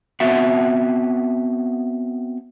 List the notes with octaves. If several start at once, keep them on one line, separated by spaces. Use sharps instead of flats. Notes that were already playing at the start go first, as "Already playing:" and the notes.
B3 C4 F#4 E5 F#5